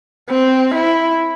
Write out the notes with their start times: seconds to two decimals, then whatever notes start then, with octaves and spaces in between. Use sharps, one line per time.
0.29 C4
0.74 E4